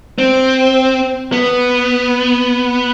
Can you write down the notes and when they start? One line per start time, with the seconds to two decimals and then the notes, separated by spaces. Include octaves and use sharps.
0.18 C4
1.32 B3